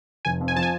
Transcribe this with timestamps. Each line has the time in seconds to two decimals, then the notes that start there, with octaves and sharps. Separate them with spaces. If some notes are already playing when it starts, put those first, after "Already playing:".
0.25 F1 G#5
0.41 F2
0.48 G#5
0.56 F3 A5
0.63 G#5